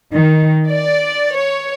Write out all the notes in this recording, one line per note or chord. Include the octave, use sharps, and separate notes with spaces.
D#3
D5
C#5